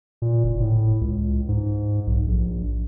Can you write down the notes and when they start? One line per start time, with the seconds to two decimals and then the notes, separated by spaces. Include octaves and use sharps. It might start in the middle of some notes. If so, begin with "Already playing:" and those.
0.22 A#2
0.44 F#1
0.61 A2
1.01 C#2
1.48 G#2
2.07 B1
2.27 A#1